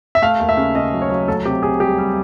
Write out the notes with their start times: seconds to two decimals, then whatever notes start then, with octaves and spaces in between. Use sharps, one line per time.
0.15 E5
0.22 A3 F5
0.40 D#2
0.49 E5
0.57 C#3
0.75 C#3 D#5
0.93 F#3
1.02 C#5
1.10 F#3
1.28 D2 A4
1.45 C3 G4
1.63 C3 G#4
1.80 G3 G4
1.98 G3